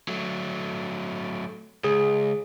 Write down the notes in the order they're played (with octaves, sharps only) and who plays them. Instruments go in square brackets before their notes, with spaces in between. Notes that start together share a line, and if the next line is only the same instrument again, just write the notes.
[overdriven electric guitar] F#3 A3
[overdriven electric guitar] C#2 [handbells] G#4